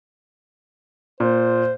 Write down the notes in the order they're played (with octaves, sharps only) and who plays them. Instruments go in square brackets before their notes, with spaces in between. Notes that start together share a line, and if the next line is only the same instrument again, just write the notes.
[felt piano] A#2 [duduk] C5